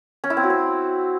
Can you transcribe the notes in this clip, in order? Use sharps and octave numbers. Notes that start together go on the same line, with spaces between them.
C#4
E4
C4
F#4
C4